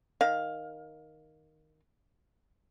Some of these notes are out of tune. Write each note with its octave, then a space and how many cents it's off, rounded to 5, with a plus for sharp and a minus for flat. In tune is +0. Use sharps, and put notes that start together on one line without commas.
D#3 +0 F5 +10